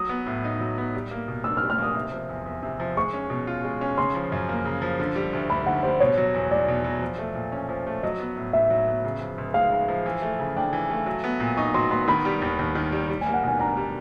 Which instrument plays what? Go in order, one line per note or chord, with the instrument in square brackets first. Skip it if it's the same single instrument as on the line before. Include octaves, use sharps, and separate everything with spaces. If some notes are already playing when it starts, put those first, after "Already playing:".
Already playing: [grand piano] F#3 [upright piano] D#6
[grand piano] B3
A2
D#4
F#3
B3
G3
A#3
B2
[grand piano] D4 [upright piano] E6
[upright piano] F6
[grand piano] G3
[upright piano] F6
[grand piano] A#3 [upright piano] D#6
[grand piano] C3
F3
E2
E2
C3
F3
[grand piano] G#3 [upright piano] C#6
[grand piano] C#4
B2
F4
G#3
C#4
[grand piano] C#3 [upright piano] C6
[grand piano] F3
F#2
A#3
C#3
F3
D3
G3
D2
[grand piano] D2 [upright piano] B5
[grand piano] D3 [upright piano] F#5
[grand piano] G3 [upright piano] C5
[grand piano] B2 [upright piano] C#5
[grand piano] F#3
E2
[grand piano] E2 [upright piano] D5
[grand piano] B2
F#3
F3
A3
A#2
C#4
F3
A3
[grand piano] F#3 [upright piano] D#5
[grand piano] B3
A2
[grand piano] A2 [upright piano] E5
[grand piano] F#3
B3
C#3
F3
C#2
[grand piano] G#3 [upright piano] F5
[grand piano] C#3
F3
E3
A3
C#3
[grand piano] D4 [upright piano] G5
[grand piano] E3
A3
F#3
B3
A#2
[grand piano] D#4 [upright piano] C#6
[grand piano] F#3 [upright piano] C6
[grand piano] B3 [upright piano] C6
[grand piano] D#3 [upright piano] B5
[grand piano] G3
D#2
D#2
D#3
G3
G3
[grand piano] A#3 [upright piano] G#5
[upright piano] F#5
[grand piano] B2 [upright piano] G#5
[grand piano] D4 [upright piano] A#5
[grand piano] G3